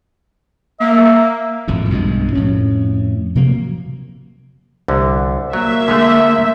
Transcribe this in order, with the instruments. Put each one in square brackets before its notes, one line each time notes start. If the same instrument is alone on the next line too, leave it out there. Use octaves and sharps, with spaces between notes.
[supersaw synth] A#3 [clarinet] E5
[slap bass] G#1 F2 A2
B1 G2 B2 G#3
F2 A2 C#4
C3 F3 F#3 A#3
[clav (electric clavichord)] C2 D3
[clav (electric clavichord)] F#3 [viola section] A#3 E5
[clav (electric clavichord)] D3 G#3 A3